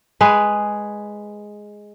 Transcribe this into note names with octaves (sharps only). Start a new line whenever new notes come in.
G#3 G#4 B4